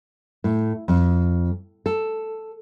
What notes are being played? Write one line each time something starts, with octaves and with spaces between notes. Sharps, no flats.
A2
F2
A4